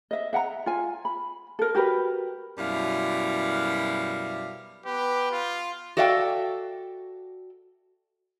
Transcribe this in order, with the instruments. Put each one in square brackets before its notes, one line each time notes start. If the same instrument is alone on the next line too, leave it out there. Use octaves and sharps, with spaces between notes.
[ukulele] D#5 E5
E5 F#5 G5 A#5
F4 G#5
B5
A4 A#4
F#4 G4 A#4 B4
[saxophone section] F#2 B2 G3 E4 F5
[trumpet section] B3 B4 [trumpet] G4
[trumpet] F4
[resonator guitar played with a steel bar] F#4 A4 D5 E5 F5 G5